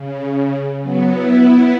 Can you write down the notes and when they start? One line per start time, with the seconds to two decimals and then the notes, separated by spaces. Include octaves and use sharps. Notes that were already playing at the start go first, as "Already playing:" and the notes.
Already playing: C#3
0.22 C#3
0.81 F#3 B3
1.11 B3 E4